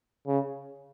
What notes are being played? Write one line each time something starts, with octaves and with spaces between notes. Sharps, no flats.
C#3